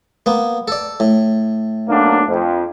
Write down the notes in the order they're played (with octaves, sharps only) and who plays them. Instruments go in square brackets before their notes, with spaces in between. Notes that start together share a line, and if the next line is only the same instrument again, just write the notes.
[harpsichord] A#3 B3
A4 D5
A2
[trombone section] B1 A#3 D4
F2